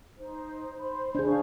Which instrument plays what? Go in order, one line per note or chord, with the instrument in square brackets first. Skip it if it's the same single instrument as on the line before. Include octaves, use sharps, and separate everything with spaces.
[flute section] D#4 C5
C5 B5
[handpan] D4 G#4 [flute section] C5 G6
[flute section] F5 C#6